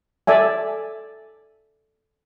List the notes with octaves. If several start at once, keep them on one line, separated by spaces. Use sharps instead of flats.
A4 D5 E5 G#5